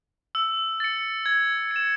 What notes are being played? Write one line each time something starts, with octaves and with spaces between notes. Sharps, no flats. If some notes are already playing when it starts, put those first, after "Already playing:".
E6
A6 C#7
G#6
C#7 E7